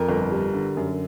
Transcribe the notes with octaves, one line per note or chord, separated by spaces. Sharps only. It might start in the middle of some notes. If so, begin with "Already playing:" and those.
Already playing: F2 A#4
G1
G3
D3
F#2